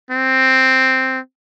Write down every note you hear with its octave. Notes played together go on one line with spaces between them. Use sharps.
C4